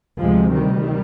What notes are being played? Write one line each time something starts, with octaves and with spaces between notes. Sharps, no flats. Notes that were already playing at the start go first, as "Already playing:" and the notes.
D2 C3 F3 G#3
D#3 G3